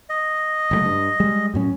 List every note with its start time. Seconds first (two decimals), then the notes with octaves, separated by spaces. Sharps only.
0.09 D#5
0.71 F#1 C#3 A3
0.85 G2
1.20 G3 G#3
1.54 F#2 A2 C#4